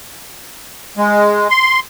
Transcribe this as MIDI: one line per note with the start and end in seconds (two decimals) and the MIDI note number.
0.97 1.48 56
1.50 1.79 84